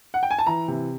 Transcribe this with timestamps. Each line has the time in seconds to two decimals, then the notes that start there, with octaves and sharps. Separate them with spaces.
0.14 F#5
0.23 G5
0.31 G#5
0.39 A5
0.47 E3 A#5
0.68 C3